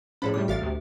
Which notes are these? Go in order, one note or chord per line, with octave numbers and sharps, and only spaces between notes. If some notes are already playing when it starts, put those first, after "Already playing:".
A2 F3 C#4 G#4 C#5 B5
A2 C3 G3 D6
A1 F#4 A4 E5 F5 A6
D2 C3